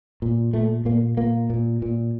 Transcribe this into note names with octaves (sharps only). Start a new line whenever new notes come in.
A#2
A#2 A3
A#2 A#3
A#2 A#3
A#2
A#2